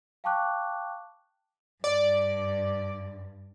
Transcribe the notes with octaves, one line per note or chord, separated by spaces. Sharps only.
F5 G5 A5 C#6 D6 F#6
G2 D5